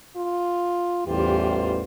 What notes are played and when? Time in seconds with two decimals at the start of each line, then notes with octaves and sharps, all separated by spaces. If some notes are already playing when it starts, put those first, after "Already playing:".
0.16 F4
1.07 A1 E2 E3 G3 F4 G4 C5